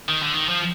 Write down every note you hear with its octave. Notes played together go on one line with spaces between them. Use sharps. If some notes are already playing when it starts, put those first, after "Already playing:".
D#3
D3
D#3
F3